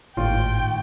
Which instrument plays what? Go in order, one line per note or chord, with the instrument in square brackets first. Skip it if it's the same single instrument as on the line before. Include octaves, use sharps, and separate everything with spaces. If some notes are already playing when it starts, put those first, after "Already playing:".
[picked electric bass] G#1 [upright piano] D#2 F4 [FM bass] A2 [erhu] G5